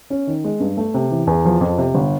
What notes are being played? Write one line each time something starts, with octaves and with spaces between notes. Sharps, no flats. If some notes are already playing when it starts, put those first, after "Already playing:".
C#4
D#3
G#3
G2
A3
C3
E3
E2
F3
F2
C3
G1